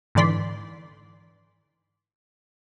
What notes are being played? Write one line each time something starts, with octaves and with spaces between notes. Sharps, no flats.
G#2 D3 E3 D5 C6 B6